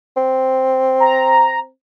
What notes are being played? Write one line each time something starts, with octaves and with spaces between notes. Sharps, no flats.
C4
A#5